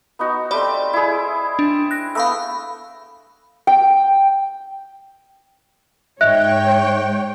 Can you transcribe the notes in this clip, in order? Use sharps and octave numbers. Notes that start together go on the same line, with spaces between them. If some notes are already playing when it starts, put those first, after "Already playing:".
B3 D#4 F#4
G3 A3 C4 D5
E4 G#4
D4
F#6 A#6
A3 B3 F5 B5 E6
G5
G#2 C#5 D#5 E5 G5 F#6